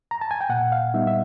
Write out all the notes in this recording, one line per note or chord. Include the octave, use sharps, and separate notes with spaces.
A#5
A5
G#5
G5
A#2 F#5
F5
G3 B3 D#4 E5
E5